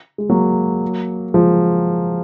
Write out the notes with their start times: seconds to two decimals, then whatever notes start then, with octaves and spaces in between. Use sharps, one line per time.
0.18 G#3
0.30 F#3 A#3
1.34 F3 G#3